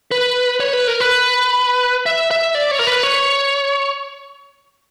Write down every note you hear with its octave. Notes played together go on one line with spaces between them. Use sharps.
B4
C#5
B4
A#4
B4
E5
E5
D5
C#5
A#4
B4
C#5